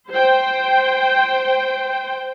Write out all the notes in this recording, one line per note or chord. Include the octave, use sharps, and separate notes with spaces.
C5 G5